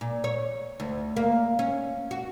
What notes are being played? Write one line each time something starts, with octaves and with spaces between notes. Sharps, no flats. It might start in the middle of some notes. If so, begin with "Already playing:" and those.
A#2
C#5
D2
A#3
C#4
F#4